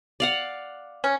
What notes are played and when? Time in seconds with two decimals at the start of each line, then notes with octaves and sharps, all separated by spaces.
0.20 D5 F5 F#5
1.04 C#4